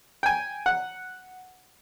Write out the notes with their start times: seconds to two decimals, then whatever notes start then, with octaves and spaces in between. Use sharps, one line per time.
0.23 G5 G#5
0.66 F#5